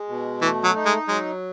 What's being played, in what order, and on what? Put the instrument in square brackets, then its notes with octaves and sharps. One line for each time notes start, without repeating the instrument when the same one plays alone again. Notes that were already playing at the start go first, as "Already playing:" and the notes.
Already playing: [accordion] G#3
B2
[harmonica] E3 [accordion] A3
[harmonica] F#3
[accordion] D#4
[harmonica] G#3
[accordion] F#3 [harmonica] G#3